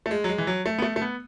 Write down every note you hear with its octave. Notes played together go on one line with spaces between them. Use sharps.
A3
G#3
F#3
G#3
E3
F#3
A3
B3
A3
A3
B3